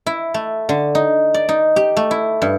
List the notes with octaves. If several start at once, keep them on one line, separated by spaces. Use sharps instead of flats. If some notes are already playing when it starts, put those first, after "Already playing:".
E4
A3
D3
D#4
D5
D#4
G4
A3
E4
G2